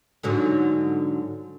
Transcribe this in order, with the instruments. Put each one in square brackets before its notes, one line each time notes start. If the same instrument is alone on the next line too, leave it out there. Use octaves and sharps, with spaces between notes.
[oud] G#2 D3 F#3